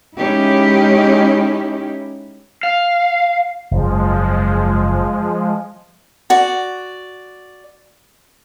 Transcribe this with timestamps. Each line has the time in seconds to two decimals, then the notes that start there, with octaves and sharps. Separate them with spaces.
0.16 G#3 C#4 D#4 E4 G4
2.63 F5
3.71 F#1 G#2 F3 G#3
6.30 F#4 D5